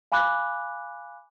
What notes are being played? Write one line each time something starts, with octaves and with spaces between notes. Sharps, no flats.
F5 G#5 B5 D6 F#6